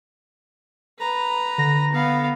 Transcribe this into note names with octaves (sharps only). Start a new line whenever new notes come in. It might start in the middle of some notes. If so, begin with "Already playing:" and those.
B4 A#5
D3 A#6
B3 F5